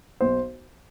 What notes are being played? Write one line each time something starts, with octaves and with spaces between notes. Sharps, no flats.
B1 C5